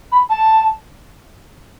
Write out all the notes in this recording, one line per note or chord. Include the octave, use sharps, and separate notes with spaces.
B5
A5